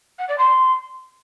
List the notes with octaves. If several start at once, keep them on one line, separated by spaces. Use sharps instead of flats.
F#5
D5
C6